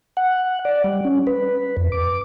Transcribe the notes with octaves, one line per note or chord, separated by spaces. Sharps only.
F#5
D5
G3
C#4
B4
F2
D6